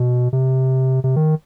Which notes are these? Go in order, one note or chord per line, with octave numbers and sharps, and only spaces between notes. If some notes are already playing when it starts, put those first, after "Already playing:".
Already playing: B2
C3
C3
D#3